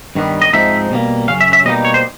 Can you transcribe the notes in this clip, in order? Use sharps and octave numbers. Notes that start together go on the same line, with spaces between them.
G2 D#3 G3 B3
D#5
G#2 F3 G#3 C4 D#4 E5
B2 G3 A#3
F#2 C#3 F#3 C#4 F5
E5
E5
B2 G3 A#3 D#4 D#5
C#5
C5